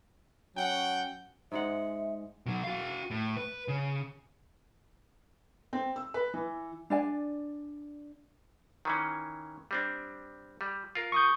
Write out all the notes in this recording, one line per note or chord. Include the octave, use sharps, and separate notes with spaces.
F#3 C#4 F#5 G5
G#2 G#3 E5 F#5
B2 F#3
F#4 F5
A2
B4
C#3
C4
E6
B4
E3
D4 D5 G#5
D#3 E3 C#4
G3 C4 D4
G3
F4 A#4
C#6 D#6 G6